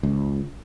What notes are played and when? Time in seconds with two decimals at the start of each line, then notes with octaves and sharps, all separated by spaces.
0.03 C#2